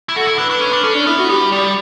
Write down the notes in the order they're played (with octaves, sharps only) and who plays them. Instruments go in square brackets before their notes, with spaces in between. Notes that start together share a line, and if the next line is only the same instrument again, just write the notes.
[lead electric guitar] E4
[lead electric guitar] F#4 [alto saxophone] A4
[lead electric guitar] E4
[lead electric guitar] D4 [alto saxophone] B4
[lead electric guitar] D4
C#4
D4
[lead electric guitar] C#4 [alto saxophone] A4
[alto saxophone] D4
[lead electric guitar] B3 [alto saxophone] E4
[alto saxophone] F#4
[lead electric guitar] G3 [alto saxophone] G4
[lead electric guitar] G3 [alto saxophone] D5